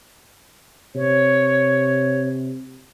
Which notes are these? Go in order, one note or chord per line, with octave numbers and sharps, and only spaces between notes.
C3 C#5